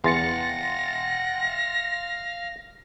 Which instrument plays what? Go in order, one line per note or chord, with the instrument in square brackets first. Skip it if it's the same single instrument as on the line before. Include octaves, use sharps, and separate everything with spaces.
[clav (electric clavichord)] E2 [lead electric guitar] F5 F#5 [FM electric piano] C6 A6 C#7 [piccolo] A#6